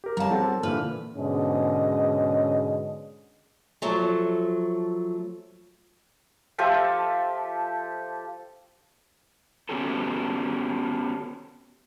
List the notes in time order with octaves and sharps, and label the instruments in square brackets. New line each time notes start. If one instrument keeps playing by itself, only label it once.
[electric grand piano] G4 A#4
[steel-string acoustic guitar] G3 A5 [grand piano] C#5 F5 A#5
[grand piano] C4 A4 F#5
[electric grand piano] A#2 D3 E3 [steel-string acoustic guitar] B4 [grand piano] F6
[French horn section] G#2 B2 D3 G#3 C#4 D#5
[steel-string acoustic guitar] F3 F#3 A3
[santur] F3 G4 A4 E5
[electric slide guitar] B3 C#4 F#4 G4 A4